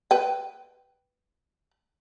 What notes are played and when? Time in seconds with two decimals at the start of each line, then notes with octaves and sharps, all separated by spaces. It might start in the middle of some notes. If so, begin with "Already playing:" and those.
0.11 B4 G5